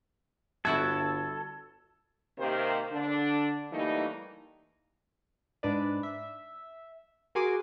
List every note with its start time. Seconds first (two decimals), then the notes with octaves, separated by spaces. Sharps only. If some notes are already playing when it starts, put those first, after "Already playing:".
0.65 G1 E4 F#4 A4 E5 G#6
2.38 C3 D#3 A#3 C4 G4 C5
2.91 D3 D4
3.72 E3 G3 A3 A#3 D#4
5.63 G#2 D4 B4 D5
6.03 E5
7.35 F#4 G#4 A#4 G#5 C6 D6